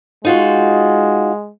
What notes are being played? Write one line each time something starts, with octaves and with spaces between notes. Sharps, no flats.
G#3 D#4 F4 F#4